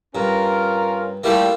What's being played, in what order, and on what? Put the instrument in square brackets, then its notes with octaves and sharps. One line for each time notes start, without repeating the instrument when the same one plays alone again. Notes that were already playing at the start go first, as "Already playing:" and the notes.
[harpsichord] G2 [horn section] C#4 F4 A#4
[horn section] G3 A3 [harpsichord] A#3 E4 F4